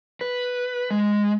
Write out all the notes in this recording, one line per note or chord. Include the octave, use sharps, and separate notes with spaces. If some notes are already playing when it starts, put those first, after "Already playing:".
B4
G#3